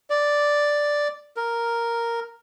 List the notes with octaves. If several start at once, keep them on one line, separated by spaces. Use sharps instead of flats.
D5
A#4